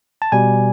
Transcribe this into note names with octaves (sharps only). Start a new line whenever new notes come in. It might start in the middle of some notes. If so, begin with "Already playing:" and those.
A5
B2 G3 G#5